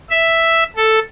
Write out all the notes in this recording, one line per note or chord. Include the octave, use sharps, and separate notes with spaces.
E5
A4